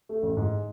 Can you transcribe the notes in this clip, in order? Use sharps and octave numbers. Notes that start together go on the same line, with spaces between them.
A3
A1
G#2